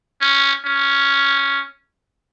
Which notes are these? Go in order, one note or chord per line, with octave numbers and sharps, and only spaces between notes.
C#4
C#4